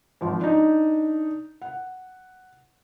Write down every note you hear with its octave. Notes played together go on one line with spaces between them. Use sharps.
G#1 F3
D4 D#4
F#5